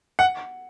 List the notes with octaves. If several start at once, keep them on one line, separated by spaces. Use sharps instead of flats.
F#5